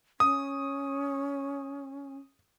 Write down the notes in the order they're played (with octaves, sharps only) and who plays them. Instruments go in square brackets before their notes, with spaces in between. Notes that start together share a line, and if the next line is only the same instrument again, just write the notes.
[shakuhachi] C#4 [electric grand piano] D#6